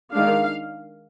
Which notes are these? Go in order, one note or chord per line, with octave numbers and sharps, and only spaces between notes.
D#3 G#3 D4 F5